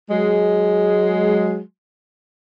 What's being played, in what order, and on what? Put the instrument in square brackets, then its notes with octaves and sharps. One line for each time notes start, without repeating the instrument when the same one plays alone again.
[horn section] F#3 G#3